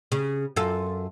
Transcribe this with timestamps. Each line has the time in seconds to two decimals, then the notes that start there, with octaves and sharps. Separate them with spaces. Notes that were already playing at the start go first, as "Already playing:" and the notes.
0.12 C#3
0.56 F#2 F4 A4